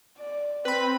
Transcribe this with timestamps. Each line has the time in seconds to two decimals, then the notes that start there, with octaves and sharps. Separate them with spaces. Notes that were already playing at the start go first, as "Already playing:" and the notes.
0.18 D5
0.65 C4 B4 B5